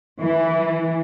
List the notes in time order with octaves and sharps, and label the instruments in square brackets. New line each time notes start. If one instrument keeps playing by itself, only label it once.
[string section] E3